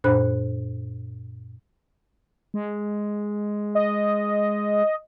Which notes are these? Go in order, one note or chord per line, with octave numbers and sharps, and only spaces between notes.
F#2 A#2 D4 C5 B5 F#6
G#3
D#5